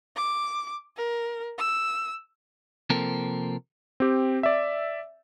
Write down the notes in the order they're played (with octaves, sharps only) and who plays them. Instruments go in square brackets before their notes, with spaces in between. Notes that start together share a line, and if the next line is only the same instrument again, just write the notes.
[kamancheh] D6
A#4
E6
[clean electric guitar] C3 F3 A#3 C4 A4 A#4
[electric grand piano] C4 G4
D5 E5